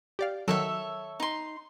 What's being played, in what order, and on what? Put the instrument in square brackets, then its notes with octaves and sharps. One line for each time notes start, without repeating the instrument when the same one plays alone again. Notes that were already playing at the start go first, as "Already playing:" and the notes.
[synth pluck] G4 D5 F5
[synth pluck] D#3 F#3 [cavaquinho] A4 C#5 E5
[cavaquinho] D#4 C6